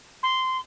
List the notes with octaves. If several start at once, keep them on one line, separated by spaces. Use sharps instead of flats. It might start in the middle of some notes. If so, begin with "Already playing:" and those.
C6